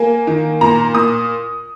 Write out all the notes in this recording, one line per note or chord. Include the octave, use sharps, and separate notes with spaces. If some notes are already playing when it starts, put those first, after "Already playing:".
Already playing: A#3 G#5
D#3
A#2 A#5
A#2 D#6